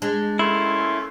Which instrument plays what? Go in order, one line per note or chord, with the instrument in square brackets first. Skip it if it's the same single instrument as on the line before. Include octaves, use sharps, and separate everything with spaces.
[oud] G#3 [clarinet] D4
[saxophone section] A3 A#3 C#4 [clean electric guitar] E4 [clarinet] C6